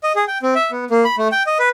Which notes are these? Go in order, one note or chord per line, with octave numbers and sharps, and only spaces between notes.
D#5
G#4
G5
C4
E5
B3
A#3
B5
A3
G5
D#5
B4